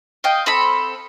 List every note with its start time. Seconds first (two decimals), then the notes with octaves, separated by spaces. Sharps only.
0.24 D#5 F5 G5
0.46 C4 A4 B5